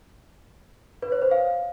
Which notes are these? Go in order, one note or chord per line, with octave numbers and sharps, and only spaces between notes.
B4
C#5
C5
F5